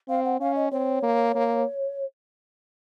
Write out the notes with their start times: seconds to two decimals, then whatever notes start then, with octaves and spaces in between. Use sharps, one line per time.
0.08 C4 F5
0.24 F#5
0.40 C#4 F5
0.56 D#5
0.71 C4 C#5
1.03 A#3
1.35 A#3